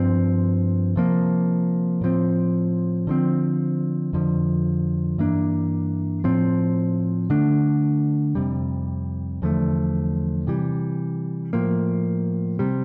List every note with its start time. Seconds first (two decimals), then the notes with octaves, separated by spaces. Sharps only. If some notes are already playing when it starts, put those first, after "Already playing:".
Already playing: G2 F3 C4
0.96 C3 F3 A#3
2.01 A2 F3 C4
3.07 D3 F3 C4
4.13 F2 D3 F3
5.18 G2 E3 A#3 D4
6.24 A2 F3 C4
7.30 D3 A3 D4
8.35 F2 C3 G3
9.42 E2 D3 F3 A3
10.47 C3 E3 G3
11.53 A2 F3 A#3
12.59 C3 G3